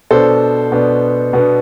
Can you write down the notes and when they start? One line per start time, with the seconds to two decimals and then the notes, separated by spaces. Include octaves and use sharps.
0.11 B2 B3 D4 A4 C5
0.72 B2 B3 D4
1.33 B2 B3 D4